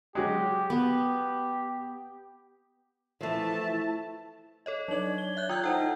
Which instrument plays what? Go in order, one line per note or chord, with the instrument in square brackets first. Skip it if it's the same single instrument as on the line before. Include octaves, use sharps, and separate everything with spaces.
[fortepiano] F#3 G#3 [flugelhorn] G4
[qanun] B3 [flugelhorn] G4
[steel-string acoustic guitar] E3 F3 [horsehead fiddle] A3 A5
[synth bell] A4 C#5 D#5
[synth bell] F#3 F#7 [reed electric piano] D4 D#4 D5 [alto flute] C#5
[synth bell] G7
E5 F#6 G6
[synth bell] F4 E6 G#6 [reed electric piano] G5 D#6
[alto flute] D#4 [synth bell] E4 C5 G5 [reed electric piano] A4 F#5